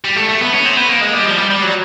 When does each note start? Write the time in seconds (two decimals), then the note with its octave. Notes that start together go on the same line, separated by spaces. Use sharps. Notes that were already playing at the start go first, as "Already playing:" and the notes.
0.05 G3
0.16 A3
0.29 A3
0.41 B3
0.53 C#4
0.65 C4
0.77 B3
0.89 A#3
1.01 G#3
1.14 G3
1.25 F3
1.38 G3
1.50 G3
1.62 F#3